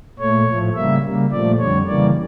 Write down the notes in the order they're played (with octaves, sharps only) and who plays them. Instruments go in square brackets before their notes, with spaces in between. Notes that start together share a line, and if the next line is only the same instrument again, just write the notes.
[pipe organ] A#2 A3 C#5
A2 F3 A3
C#3 G3 A#3 E5
C#3 G3 A#3
A#2 F3 A3 D5
F2 D3 G3 C#5
C#3 E3 G3 A#3 D5